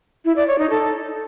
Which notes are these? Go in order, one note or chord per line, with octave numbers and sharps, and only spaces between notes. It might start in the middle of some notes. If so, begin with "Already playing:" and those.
E4
D5
C#5
D#4
A4